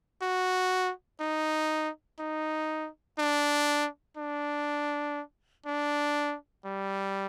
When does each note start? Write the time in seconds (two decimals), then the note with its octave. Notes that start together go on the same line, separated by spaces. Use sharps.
0.22 F#4
1.20 D#4
2.20 D#4
3.19 D4
4.17 D4
5.66 D4
6.65 G3